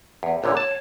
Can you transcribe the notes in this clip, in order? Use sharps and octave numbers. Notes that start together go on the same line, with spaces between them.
E2
A#1 A#2 D3 C#5
A5